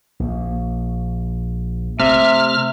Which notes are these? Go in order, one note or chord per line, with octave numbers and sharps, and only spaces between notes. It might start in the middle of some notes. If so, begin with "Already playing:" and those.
A#1
C3 A3 E5 F6